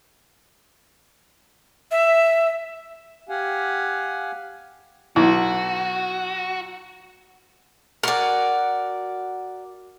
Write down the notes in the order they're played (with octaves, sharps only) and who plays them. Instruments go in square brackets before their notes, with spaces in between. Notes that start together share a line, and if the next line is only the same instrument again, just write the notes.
[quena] E5
[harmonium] G4 F5 F#5 G#5
[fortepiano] B1 [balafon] E4 [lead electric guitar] F#4
[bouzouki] F#4 F#5 G#5 [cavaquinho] A#4 D5